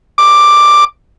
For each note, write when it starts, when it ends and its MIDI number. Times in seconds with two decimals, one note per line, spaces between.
0.18 0.85 86